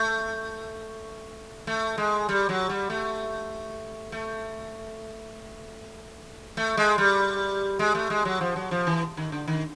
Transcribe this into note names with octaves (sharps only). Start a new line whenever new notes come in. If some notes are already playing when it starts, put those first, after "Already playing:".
Already playing: A3
A3
G#3
G3
F#3
G3
A3
A3
A3
G#3
G3
G#3
A3
G#3
F#3
F3
F#3
F3
E3
D#3
D3
D#3